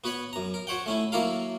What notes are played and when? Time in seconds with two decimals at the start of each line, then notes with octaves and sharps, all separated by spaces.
0.04 B3 F#4 B4 C#5 F#5
0.33 F#2 A#5
0.54 A#4
0.67 F#4 C5 C#5 F#5 G5
0.86 A3 C#4 E4
1.12 F#3 A#3 E4 A4 A#4 F5